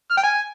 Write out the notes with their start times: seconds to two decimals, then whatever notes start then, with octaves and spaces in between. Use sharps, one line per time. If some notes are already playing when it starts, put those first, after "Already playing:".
0.11 F6
0.17 G5
0.24 G#5